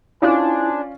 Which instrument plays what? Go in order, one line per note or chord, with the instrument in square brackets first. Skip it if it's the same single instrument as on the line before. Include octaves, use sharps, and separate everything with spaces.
[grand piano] C#4 F4 D5 [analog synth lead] D4 [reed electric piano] E4 [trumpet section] G#4 C5 G#5